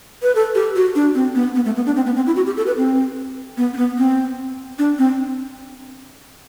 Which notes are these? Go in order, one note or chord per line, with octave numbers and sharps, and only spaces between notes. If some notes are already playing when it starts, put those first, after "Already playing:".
B4
A4
G4
F#4
D4
C4
B3
B3
A3
B3
D4
C4
B3
C4
E4
F#4
G4
A4
B4
C4
B3
C4
B3
C4
D4
C4